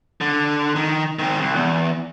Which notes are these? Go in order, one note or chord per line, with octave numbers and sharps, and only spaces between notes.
D3
D#3
D#3 C4
C2
E2